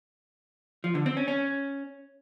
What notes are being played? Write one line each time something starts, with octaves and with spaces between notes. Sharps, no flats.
F3
D3
C4
C#4
C#4